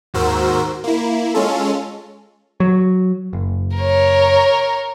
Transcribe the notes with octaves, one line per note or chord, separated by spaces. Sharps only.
D#2 G#2 F#4 A#4 C5 E6
A#3 E4
G#3 C#4 F4 A4
F#3
F#1
A#4 C#5